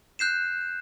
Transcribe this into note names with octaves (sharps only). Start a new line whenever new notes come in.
F#6 G6 C7 E7